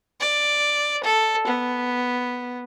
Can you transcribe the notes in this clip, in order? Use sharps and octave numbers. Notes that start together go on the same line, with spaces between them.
D5
A4
B3